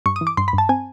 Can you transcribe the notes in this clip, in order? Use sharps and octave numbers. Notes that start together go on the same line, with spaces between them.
G2 C#6
D#6
E3
D6
G2 C6
B5
G2
A5
C4 G#5